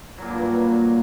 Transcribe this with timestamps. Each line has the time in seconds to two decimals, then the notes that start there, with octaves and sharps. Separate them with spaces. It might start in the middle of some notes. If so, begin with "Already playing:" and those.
0.18 F#3
0.22 A#2
0.26 A#3
0.30 G2